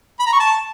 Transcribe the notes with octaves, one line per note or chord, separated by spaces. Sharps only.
B5
A#5
C#6
A5